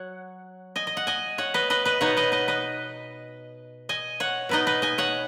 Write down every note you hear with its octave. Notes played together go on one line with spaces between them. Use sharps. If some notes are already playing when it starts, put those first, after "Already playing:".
Already playing: F#3 C#5 F#5
D#5 G#5
D#5
F#5
D#5 G#5
C#5 F#5
B4 D#5
B4 D#5
B4 D#5
B2 B3 D#4 C#5 F#5
B4 D#5
B4 D#5
B4 D#5
D#5 G#5
C#5 F#5
B2 B3 D#4 B4 D#5
B4 D#5
D#5 G#5
C#5 F#5